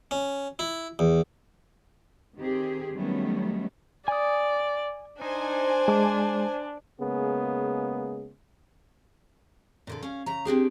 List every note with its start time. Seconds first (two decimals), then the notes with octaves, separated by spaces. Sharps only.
0.11 C#4
0.59 E4
0.99 E2
2.38 D#3 C4 G4 G#4
2.95 D#3 F#3 G3 A3 B3 C#4
4.08 D5 G#5 D#6
5.22 D4 D#4 C5 G#5
5.88 G#3 A5 D6
7.00 C#3 G#3 A#3 B3 G#4
9.87 A#2 D3 A4
10.03 C#4 F5
10.26 C#3 A#5
10.45 C4 D4 G4 G#4